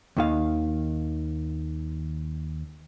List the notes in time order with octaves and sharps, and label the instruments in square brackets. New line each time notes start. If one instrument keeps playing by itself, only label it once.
[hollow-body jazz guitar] D#2 D#3 F5